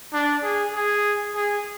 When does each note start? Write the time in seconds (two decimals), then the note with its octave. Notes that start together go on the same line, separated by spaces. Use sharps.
0.13 D4
0.43 G#4
0.73 G#4
1.35 G#4